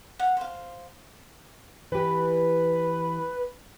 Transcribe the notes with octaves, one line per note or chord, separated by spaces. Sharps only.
F5 F#5
C5 F5
E3 G4 B4